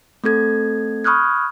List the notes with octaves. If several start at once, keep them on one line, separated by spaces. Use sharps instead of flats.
A3 C4 A4 G#6
B5 C#6 D#6 F6 F#6 G#6